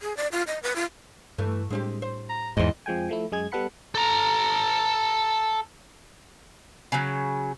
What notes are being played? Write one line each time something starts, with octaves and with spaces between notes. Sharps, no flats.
G#4
D5
F4
D#5
B4
F4
G2 E3 A3
A2 G3 G#3 C4 D4 G4
C5
A#5
E2 G#2 E3 C5 D#5
F2 F3 G#3 G5 G#5
F3 A3 E4
F#2 G#3 G#4 G#6
G3 B3 A4 F#5 B5 C#7
A4 A#5
C#3 F#3